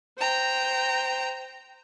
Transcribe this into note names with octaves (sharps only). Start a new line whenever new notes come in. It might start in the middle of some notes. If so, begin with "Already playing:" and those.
C5 G5 A#5